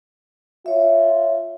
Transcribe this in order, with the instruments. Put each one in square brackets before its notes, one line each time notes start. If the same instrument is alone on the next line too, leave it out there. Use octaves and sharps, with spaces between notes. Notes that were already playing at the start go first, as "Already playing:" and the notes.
[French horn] F4 [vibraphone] C#5 E5